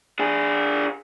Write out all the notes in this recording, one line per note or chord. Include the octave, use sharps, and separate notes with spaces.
D4 G#4